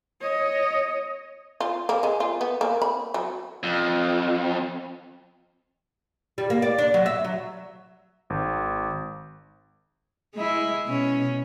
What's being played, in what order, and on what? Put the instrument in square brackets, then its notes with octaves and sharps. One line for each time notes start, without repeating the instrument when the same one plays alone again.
[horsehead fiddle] C#5 D#5
[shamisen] F4
A#3
G#3
F4
B3
A#3
B5
F#3
[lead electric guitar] F2
[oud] G3
A#3
D5
D4
F#3
E5
F#3
[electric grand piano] G#1
[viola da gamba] G#3 E4
B2 C#4